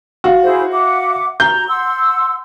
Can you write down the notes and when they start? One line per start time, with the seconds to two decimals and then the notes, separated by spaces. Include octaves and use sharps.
0.24 F#4 F5
0.43 E4 G#4 C5
0.71 E5 F#5 D6
1.40 F#4 A#5 G6
1.68 F#5 C6 E6